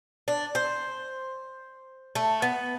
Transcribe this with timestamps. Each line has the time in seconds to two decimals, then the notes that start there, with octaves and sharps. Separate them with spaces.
0.28 D4
0.55 C5
2.15 A3
2.42 B3